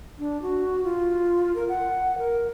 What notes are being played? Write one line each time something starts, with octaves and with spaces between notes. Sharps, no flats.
D4
F#4
F4
A#4
F#5
A#4